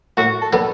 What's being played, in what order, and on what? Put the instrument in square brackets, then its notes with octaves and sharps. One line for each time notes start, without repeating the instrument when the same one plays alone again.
[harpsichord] A2 [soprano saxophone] F#4
[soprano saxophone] A4
[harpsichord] F#3 B3 D4 A4